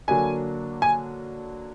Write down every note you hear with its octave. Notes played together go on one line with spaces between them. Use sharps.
D3 F#3 A#3 D4 G#5
G#5